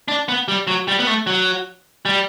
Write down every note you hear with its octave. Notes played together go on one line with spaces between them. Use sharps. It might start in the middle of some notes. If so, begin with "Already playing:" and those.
D4
B3
G3
F#3
G3
B3
A3
F#3
G3